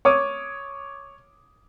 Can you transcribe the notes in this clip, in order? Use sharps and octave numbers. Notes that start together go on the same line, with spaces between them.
C#5 D6 D#6